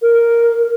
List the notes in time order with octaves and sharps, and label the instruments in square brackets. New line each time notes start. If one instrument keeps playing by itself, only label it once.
[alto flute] A#4